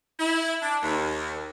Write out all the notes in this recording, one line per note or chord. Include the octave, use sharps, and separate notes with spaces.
E4
D4
D#2